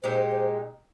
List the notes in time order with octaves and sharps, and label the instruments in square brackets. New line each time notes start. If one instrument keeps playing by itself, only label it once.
[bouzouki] A#2 G#3 D#4 G4 [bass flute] C5
[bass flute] C5